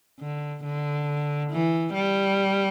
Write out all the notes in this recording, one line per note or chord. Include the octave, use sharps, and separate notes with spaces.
D3
D3
E3
G3